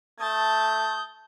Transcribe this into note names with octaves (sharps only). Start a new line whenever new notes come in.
A3 A5 D#6 G6